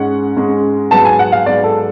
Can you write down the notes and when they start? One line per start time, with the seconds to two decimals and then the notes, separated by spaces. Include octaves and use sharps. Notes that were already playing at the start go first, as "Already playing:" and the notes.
Already playing: G#2 G#3 C#4 F#5
0.36 G#2 G#3 C#4
0.91 G#2 F#3 B3 A5
1.05 G#5
1.19 F#5
1.32 F5
1.46 G#2 F#3 B3 D5
1.64 A4